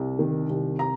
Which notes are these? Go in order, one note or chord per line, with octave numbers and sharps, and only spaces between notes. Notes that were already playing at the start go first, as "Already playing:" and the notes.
Already playing: C2
D#3
C2
A#5